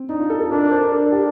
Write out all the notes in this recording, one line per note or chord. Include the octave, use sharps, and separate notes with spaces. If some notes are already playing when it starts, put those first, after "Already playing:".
Already playing: C4
D4 D#4
F4
A4
A4
D4 A#4
A#4
C5
A#4
D4 A4
G4